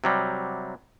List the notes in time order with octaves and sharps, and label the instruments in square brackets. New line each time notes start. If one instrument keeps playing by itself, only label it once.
[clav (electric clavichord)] C3 F#3 G3